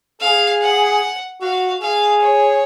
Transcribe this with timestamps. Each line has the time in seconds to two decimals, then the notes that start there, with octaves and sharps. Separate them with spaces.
0.21 G#4 F5
0.61 F#5
1.41 F#4 F5
1.81 G#4 F5
2.21 C#5